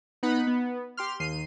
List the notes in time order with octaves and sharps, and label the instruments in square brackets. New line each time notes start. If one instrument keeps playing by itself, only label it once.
[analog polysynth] B3 D#4 F#5 B5
B3
G4 C6 F6
D#2 C7 D#7